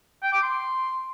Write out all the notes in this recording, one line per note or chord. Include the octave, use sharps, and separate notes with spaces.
G5
D6
C6